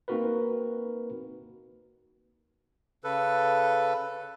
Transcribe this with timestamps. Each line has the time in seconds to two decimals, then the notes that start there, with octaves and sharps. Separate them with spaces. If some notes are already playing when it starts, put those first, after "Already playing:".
0.08 A#3 C4 D#4 F#4 A#4 B4
3.04 C#3 A4 B4